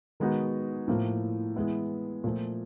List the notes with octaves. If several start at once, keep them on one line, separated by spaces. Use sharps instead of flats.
D#3 G#3 B3 D#4 F#4
A2 F3 A#3
E3 G#3 B3 E4
A#2 F3 A3